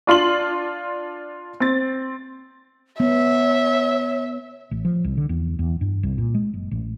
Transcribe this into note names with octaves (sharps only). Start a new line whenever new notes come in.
D4 F4 C6 F#7
C4 A6
B3 C#5 E5
A1
F3
C2
D3
E2
E2
G2
C2
A#2
G#3
F#1
A1